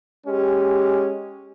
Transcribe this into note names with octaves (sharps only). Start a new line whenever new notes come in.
G#3 C#4 G4